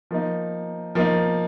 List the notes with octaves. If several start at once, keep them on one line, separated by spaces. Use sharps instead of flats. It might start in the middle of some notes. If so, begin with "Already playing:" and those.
F3 A#3 D#4
F3 A#3 D#4